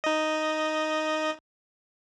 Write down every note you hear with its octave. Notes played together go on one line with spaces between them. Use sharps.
D#4 D#5